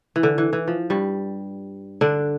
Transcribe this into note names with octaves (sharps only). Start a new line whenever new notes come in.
E3
D3
E3
E3
F3
G2 G3
D3 D4